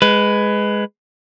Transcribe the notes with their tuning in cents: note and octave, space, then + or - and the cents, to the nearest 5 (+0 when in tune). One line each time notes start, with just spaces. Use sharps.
G#3 +0 B4 +15